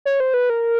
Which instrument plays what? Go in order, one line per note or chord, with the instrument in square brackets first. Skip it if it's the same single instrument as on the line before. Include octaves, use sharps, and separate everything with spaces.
[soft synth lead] C#5
C5
B4
A#4